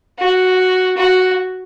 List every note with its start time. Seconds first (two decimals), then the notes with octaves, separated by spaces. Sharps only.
0.18 F#4
0.97 F#4